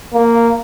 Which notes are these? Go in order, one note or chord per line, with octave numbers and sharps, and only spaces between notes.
A#3